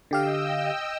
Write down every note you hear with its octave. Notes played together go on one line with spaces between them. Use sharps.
D3 G4 D#5 F5 G5 E6